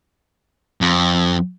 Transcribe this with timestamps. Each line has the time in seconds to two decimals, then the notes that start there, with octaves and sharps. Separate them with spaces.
0.81 F2